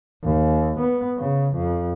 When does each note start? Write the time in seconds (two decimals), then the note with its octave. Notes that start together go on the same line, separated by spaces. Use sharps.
0.24 D#2
0.79 B3
1.17 C#3
1.55 F2